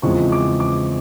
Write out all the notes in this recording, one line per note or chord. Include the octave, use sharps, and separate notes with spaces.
E2 C#3 F3 G#3 C4 C#6
D6
D6